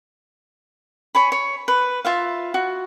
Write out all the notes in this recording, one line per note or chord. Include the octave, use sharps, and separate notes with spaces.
C#5 G#5 B5
C#5
B4
F4 E5 F5
F#4